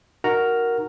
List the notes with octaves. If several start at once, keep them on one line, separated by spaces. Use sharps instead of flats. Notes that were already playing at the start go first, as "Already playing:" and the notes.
D#4 F#4 A#4 F#5 A#5